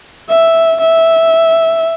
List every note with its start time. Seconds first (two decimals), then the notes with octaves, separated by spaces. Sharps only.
0.29 E5
0.80 E5